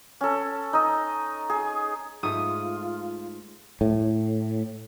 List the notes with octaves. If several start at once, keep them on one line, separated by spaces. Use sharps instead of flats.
C#4 A4
D#4 D#5
G#4
G#2 A3 F4 D#6
A2